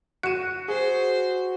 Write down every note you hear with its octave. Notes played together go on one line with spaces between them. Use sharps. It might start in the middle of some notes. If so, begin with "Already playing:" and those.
F#4 F#6 C#7 D#7 E7
G#4 C5